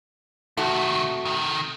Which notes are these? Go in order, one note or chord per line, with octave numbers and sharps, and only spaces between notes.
C3 D#3 A3 F#4
C3 D#3